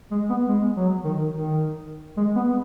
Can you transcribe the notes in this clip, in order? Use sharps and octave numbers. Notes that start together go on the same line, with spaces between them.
G#3
B3
G#3
F#3
D#3
D#3
G#3
B3